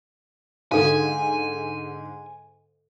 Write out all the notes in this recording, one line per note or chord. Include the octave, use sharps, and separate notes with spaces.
G#2 D3 A4 F5 G#5